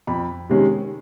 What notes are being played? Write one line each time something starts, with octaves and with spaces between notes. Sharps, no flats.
F2 B5
C3 D#3 G#3 C#4